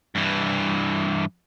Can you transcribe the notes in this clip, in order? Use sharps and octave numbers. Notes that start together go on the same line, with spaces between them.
G2 E3